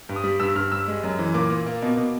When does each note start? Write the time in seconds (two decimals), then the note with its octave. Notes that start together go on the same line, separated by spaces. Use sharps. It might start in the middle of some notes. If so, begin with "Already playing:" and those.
0.09 G2
0.16 D#6
0.24 G3
0.40 G2 E6
0.55 G2 F6
0.72 G3 E6
0.88 G#3
1.04 F#2
1.19 E3
1.34 A#2 D6
1.50 A#2
1.66 A#3
1.82 B2
1.97 B2